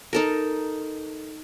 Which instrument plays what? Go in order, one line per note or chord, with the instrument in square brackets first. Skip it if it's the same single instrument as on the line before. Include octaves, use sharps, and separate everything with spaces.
[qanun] D#4 A4 A#4